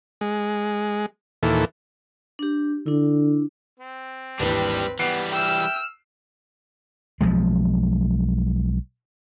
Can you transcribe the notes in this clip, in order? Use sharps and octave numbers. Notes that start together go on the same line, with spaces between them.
G#3
D#2 A#2 E3 A4
D4 G4
D3 D4 E4
C4
G#1 D#2 E3 G3 D4 B4
E3 G3 B3 F#6 C7 D7
E5 G5 E6 F6
B1 F3 G#3